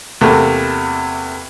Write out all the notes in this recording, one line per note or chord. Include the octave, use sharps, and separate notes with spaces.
E2 C3 A3 A#3